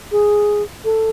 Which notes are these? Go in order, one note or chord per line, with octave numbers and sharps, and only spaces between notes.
G#4
A4